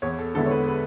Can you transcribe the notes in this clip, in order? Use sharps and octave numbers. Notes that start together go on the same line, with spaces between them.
E2 C#5
A4
D3 G#3 B3 E4 A4
C#5
B4
B4